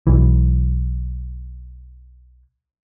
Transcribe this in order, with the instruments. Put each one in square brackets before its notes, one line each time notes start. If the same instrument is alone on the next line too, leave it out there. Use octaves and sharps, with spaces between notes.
[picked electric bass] B1 E3